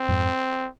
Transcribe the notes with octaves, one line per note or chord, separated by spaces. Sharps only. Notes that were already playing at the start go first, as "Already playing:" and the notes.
Already playing: C4
F2 G#2